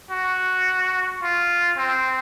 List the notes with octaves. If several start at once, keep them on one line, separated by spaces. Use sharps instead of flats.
F#4
F4
C4